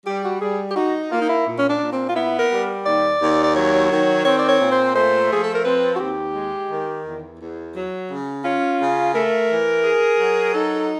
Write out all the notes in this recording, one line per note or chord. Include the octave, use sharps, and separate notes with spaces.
G3 G4
F#4
G3 G#4
G4
D#4 F#4
A#3 F4
D#4
E4
A#2
C#4
D4
A#2
C4
F4
B3 E4
A#4
G3
D#2 D5
D#2
D5
F#3 C#5
D#3
C4 C#5
D5
C#5
A#2
C5
A3 C5
F3 G#4
A4
A#4
C4 B4
F#4
D#2 G4
G#3
D#3
E2
E2
F#3
C#3
C#4 F4
C#3
A3 A#4
E3
G#4
F#3
D#4 A4